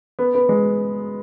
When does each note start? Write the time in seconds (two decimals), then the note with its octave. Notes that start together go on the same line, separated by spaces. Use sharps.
0.19 B3
0.35 B3
0.49 G#3